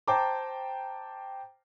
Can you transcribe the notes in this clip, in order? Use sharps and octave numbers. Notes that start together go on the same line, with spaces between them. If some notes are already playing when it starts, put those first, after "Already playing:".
C5 G5 A5 A#5 D6